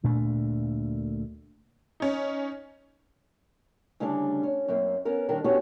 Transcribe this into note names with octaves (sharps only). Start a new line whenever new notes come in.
D2 A#2 A3 D4
C#4 D#4
D2 C#3 G3 D4 D5
C#4
F#2 A#3 C4
B3 C#4 A#4
D#2 D#3 G3 D4 A#4
B3 C#4 D4 F#4 G4 C#5